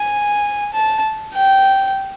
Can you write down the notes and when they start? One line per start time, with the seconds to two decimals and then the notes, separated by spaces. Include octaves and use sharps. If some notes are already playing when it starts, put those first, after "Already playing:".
Already playing: G#5
0.73 A5
1.34 G5